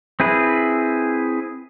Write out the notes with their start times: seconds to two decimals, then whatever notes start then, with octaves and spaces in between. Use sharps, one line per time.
0.20 C4 E4 G#4 B4